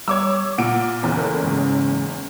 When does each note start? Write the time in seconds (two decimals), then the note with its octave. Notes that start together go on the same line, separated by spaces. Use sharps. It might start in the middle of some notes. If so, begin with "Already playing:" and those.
0.08 G3 C#5 D6 E6
0.58 A#2 F#5 D7
1.03 F#1 E2
1.17 A4 A#4
1.43 G#2 C#3